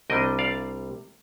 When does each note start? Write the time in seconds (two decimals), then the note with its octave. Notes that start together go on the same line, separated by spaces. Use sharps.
0.10 C2 C3 G3 D4 D#5 G5
0.39 D5 F5